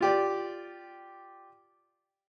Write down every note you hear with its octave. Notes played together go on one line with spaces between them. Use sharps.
F4 G4 D5